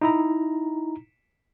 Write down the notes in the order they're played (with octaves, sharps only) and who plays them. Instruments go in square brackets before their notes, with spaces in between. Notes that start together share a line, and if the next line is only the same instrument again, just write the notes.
[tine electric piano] D#4 E4 A#5